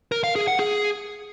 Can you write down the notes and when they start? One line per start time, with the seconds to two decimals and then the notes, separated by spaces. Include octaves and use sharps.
0.12 A#4
0.24 F5
0.36 G#4
0.48 F#5
0.60 G#4